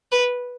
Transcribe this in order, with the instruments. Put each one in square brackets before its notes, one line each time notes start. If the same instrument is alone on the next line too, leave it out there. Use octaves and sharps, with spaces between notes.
[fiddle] B4